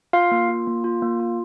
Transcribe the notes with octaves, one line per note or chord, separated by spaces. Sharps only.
F4 F5
A#3
F4
A#3
F4
A#3
F4